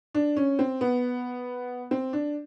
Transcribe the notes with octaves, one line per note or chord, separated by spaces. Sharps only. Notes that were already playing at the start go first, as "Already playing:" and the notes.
D4
C#4
C4
B3
C4
D4